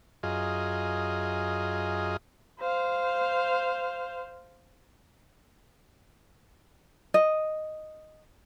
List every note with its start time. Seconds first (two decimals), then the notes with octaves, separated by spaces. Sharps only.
0.23 F#2 F4 G#4 D#5
2.60 C5 F5
7.14 D#5